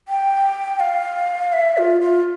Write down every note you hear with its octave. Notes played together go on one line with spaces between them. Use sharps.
G5
F5
E5
F4
F4